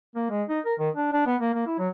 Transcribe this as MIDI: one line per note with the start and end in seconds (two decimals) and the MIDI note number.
0.16 0.26 58
0.30 0.43 56
0.49 0.60 63
0.66 0.75 70
0.80 0.90 51
0.96 1.11 62
1.13 1.22 62
1.27 1.36 59
1.41 1.54 58
1.54 1.66 58
1.67 1.75 64
1.79 1.89 54